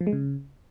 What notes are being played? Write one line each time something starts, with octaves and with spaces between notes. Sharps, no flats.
F3
G#3
C#3